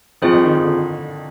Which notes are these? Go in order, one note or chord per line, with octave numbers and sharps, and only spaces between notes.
F2 F3 C4 F4 G#4 C5
F2 F3
D#3
D#3
D3